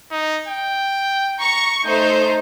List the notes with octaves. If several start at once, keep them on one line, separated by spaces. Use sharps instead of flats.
D#4
G5
A#5 C#6
A3 D#4 C5 G6